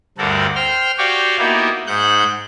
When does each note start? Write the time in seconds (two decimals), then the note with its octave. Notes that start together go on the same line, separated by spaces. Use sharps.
0.18 D2 G2 C4 A4 A#4 F#5
0.55 C5 G5 F6
0.98 F#4 G4 C#5 D5 F5 G5
1.39 A#3 B3 D#4 E4 F#4 G4
1.87 G#2 F#5 F#6 G6